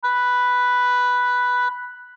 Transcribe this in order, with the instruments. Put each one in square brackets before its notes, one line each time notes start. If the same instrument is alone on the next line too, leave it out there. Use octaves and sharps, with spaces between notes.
[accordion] B5 F#6